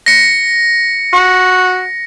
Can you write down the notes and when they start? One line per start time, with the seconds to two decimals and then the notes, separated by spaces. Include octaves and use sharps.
0.06 A#6 C#7
1.13 F#4